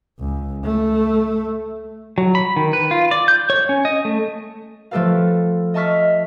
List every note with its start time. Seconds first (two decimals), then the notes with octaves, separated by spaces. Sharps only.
0.20 C#2
0.64 A3
2.18 F#3
2.35 B5
2.56 D#3
2.73 B4
2.91 F4
3.11 D5
3.28 G6
3.50 C#5
3.69 C#4
3.85 D#5
4.05 A3
4.91 F3 A3 G4 A4 B4 F5
5.74 D#5 E5 A5 C#6 F6 B6